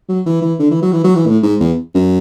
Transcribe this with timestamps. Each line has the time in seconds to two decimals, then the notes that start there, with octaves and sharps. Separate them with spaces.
0.09 F#3
0.26 E3
0.42 E3
0.59 D3
0.71 E3
0.82 F#3
0.93 E3
1.04 F#3
1.16 E3
1.26 A2
1.43 G#2
1.60 E2
1.95 F#2